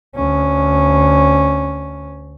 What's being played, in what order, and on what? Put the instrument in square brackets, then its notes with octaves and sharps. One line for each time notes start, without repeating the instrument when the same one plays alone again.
[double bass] D2 C#4